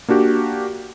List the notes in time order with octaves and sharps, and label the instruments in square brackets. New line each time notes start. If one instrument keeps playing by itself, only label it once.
[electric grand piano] A#3 D4 F#4 G4